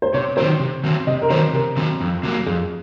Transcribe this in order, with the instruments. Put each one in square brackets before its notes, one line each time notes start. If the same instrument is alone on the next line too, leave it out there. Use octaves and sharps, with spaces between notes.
[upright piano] C5
[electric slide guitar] C3 [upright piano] C#5
[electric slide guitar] D#3 F#3 C4 [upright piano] C5
[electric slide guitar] C3
D#3 F#3 C4
[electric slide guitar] C3 [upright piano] D#5
[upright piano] A#4
[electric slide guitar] D#3 F#3 C4 [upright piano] C5
[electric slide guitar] C3 [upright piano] A#4
[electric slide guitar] D#3 F#3 C4
F2
C3 F#3 A#3
[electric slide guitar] F2 [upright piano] G#4